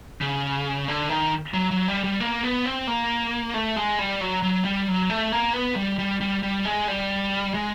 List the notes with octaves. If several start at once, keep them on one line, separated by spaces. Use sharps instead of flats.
C#3
D3
D#3
F#3
F#3
G3
G3
A#3
B3
C4
A#3
A3
G#3
G3
F#3
F#3
G3
F#3
A3
A#3
B3
G3
G3
G3
G3
G#3
G3
G#3